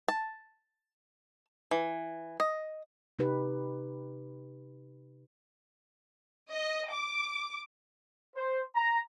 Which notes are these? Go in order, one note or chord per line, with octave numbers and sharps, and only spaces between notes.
A5
E3
D#5
C3 D#4 G4 B4
D#5
D6
C5
A#5